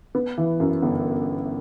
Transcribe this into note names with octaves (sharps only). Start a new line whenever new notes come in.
B3
E3
F#2
G1